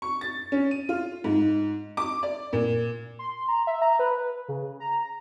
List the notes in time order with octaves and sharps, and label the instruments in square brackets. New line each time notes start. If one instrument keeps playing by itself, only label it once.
[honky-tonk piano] C#6
A6
C#4
D#7
F4
G#2
D6
D5
A#2
[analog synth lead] C6
A#5
E5
A#5
B4
C#3
A#5